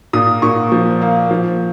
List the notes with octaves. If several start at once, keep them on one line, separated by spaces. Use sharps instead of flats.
A#2 D#6
A#2 C#6
F3
A#3
F3